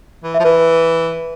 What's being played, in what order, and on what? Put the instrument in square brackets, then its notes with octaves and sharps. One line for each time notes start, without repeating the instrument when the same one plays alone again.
[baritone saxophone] E3
[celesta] E5
[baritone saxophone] F3
[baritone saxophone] E3 [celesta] B4